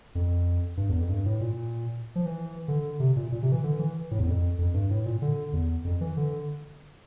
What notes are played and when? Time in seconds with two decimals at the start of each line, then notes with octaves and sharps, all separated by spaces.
0.15 F2
0.77 G2
0.89 E2
0.99 F2
1.09 G2
1.25 A2
1.41 A#2
2.16 F3
2.26 E3
2.68 D3
3.00 C3
3.16 A#2
3.32 A#2
3.43 C3
3.52 E3
3.64 D3
3.79 E3
4.11 A2
4.19 E2
4.26 F2
4.59 F2
4.74 G2
4.90 A2
5.06 A#2
5.22 D3
5.53 E2
5.85 F2
6.01 E3
6.17 D3